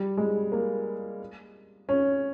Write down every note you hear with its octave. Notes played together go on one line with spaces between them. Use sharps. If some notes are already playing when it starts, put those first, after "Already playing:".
Already playing: G3
G#3
A#3
C#4